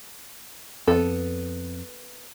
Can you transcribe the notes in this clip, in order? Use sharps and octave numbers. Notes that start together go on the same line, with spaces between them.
F2 B3 A4